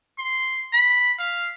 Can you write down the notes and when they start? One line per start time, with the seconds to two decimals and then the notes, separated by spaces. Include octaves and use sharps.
0.18 C6
0.73 B5
1.19 F5